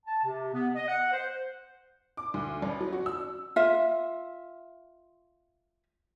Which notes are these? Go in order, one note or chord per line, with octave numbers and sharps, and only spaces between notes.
A5
C3
B3
D#5
F#5
C5
D6
D2
A1
F#3
F#4
E6
F4 E5